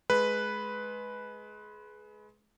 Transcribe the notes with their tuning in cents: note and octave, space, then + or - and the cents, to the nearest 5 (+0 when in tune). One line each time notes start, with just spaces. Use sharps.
G#3 +25 B4 +0